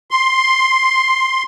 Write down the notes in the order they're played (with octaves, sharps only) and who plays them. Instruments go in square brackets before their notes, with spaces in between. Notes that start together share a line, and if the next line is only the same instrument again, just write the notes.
[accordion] C6